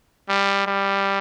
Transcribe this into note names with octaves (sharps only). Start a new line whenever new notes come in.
G3
G3